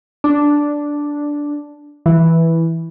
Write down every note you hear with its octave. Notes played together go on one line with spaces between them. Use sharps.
D4
E3